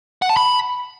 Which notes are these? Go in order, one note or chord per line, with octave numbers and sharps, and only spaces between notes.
F#5
A5
B5